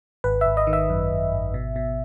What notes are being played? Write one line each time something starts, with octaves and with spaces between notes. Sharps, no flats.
G#1 B4
E5
G#1
D#5
D#3
E5
F#2
G#1
G#1
B2
B2